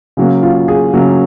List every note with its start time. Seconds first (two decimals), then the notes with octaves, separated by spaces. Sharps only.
0.17 C#3 F#3 A#3
0.43 F4
0.68 G#4
0.93 C#3 F#3 A#3